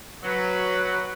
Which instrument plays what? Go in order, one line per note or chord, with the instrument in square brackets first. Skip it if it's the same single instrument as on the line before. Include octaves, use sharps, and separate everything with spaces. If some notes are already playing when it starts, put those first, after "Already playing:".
[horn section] F#3 [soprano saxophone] B4